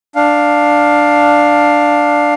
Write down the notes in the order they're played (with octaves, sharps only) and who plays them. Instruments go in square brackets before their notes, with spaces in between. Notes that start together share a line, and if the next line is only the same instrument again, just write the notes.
[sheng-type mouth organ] D4 F5